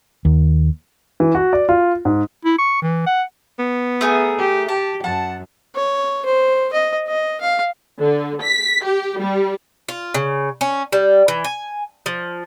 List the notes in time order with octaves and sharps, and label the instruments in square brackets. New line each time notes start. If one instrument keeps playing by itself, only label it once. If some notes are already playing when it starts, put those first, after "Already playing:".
[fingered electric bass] D#2
[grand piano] E3
F#4
D5
F4
G#2
[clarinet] E4
C#6
E3
F#5
[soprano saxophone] B3
[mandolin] A3 G#4 A#4
[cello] G4
[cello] G4 [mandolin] A5
[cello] F#2 [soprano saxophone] F#5 [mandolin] A5
[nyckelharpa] C#5
C5
D#5
D#5
F5
[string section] D3
B6
G4
G3
[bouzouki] F4
C#3
C#4
G3
E3
G#5
F3